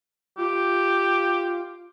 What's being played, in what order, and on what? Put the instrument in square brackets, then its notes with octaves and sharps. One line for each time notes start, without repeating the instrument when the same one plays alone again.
[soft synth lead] F4 [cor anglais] G4